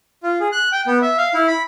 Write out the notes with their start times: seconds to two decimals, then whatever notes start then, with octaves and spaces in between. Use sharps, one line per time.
0.23 F4
0.40 G#4
0.52 F#6
0.72 G5
0.87 B3
1.02 E5
1.18 F5
1.34 E4
1.47 B5